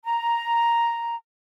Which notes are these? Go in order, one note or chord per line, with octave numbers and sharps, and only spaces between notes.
A#5